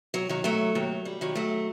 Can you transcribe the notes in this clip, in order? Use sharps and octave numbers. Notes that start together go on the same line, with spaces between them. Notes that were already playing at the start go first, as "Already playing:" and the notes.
F#3
D#3 F#3
F#3 A3
D#2 F#3
G3
D#3 F#3
F#3 A3